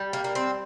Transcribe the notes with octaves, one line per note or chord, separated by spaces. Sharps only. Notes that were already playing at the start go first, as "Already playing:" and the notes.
Already playing: G3
A#3
A#3
C4